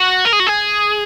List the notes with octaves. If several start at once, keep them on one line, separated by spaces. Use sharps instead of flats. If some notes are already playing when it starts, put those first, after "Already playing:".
Already playing: F#4
A#4
G#4
F#4
G#4